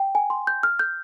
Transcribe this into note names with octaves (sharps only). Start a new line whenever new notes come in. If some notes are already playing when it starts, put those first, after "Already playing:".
Already playing: G5
G#5
C6
G6
F6
G6